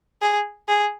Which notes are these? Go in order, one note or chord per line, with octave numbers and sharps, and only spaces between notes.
G#4
G#4